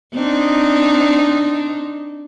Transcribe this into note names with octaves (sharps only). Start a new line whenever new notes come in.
C4 D4 D#4